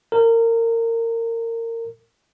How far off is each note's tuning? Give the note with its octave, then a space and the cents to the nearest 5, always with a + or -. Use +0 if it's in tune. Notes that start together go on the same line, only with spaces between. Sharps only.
A#4 -25